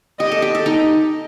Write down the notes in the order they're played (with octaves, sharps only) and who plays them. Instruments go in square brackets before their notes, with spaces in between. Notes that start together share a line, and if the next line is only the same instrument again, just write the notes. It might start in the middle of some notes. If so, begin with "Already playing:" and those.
[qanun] G4 [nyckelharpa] D#5
[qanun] A4
G4
A4
D#4 G4